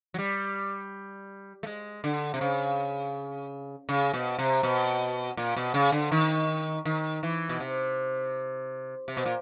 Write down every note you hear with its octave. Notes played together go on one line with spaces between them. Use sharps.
F#3
G3
A3
G#3
D3
C3
C#3
C#3
B2
C3
B2
A#2
B2
C#3
D3
D#3
D#3
E3
B2
C3
C3
B2
A#2